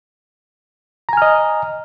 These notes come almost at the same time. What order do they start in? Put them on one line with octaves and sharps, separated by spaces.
A#5 G#5 F6 D#5